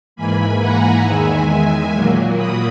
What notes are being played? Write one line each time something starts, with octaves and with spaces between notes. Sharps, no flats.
G#2 E3 A#3 G#5 B5
F#5 A#5
E2 D#3 G#3 E5 G#5
A#2 F#3 A#3
B5 D#6